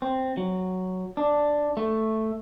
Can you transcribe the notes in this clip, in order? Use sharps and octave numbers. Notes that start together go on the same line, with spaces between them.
C4
F#3
D4
A3